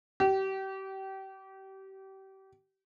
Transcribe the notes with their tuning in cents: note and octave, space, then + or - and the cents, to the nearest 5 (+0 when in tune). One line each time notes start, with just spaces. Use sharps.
G4 -30